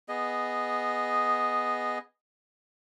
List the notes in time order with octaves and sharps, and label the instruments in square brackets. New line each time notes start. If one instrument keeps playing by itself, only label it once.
[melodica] B3 G#4 D#5